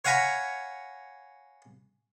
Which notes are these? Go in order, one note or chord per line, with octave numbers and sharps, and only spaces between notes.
C#5 F5 F#5 G#5 A#5 B5